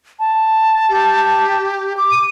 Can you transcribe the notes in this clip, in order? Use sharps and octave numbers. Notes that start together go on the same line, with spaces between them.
A5
G4
D6
D#7